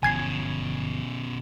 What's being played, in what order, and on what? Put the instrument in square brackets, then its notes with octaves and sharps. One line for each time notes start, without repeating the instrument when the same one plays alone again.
[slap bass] G1 E3 F3 [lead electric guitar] B2 C#4 [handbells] G#5 G#6 C7